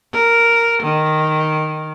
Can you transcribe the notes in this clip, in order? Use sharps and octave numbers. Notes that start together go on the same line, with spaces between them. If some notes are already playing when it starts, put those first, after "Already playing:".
A#4
D#3